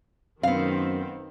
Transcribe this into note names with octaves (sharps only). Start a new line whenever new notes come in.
F#2 D#3 B3 C4 F5